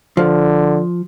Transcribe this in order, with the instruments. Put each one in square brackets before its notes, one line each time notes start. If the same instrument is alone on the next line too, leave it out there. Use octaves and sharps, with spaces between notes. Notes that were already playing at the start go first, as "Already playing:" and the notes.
[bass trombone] D3 [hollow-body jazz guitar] F3